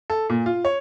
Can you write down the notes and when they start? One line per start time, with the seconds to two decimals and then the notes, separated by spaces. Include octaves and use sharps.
0.10 A4
0.29 A#2
0.46 F4
0.65 C#5